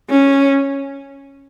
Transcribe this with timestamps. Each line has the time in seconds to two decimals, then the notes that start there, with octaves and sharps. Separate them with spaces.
0.10 C#4